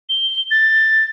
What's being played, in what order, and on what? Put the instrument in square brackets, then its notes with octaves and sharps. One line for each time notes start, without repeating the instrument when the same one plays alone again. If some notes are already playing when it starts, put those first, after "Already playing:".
[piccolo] G7
A6